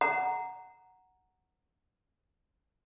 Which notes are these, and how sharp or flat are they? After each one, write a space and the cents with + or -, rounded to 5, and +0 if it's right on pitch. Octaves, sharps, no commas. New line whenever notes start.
F#5 +0 A#5 +0